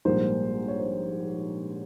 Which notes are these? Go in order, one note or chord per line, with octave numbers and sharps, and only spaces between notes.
A#1 G#2 G3 A#3 C5
C#5
C5